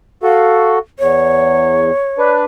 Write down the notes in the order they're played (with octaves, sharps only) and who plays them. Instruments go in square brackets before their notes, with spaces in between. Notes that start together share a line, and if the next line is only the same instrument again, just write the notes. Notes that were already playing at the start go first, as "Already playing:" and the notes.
[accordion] F#4 A4 [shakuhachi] F5
[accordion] E2 [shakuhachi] C#5
[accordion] D4 B4